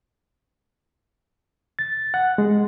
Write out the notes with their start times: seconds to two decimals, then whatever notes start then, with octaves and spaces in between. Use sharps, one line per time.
1.79 A6
2.14 F#5
2.38 G#3